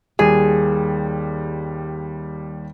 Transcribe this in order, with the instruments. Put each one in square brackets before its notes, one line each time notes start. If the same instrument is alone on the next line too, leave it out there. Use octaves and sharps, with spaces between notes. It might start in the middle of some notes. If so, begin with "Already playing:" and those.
[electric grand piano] D#2 G3 [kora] G#4